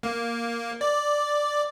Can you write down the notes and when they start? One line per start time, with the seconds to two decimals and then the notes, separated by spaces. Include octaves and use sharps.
0.03 A#3
0.81 D5